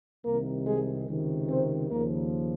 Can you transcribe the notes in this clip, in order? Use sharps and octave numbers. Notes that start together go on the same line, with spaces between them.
C2 C3 D#3 A#3 A#4
G#3 G#4
C#2 C3 D#3
C4 C5
D#2 C#3 F3 A#3 A#4